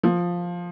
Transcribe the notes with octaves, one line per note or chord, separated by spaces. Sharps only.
F3